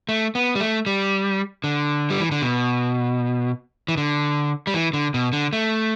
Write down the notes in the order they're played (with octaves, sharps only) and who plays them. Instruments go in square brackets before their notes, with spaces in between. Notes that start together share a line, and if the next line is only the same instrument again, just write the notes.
[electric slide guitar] A3
B3
G3
A3
G3
D3
G3
E3
D3
B2
E3
D3
G3
E3
D3
B2
D3
A3